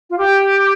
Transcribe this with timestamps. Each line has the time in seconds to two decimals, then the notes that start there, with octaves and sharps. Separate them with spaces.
0.10 F4
0.17 G4